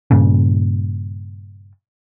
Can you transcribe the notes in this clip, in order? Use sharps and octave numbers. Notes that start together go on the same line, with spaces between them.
G2 A#2 C#3